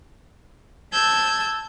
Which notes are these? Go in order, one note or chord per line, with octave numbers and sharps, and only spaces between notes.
A5 E6 G6 G#6